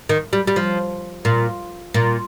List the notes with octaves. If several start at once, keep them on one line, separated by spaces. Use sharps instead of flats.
D#3
G3
G3
F3
A#2
A#2